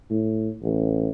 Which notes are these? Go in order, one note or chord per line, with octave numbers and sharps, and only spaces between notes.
A2
A1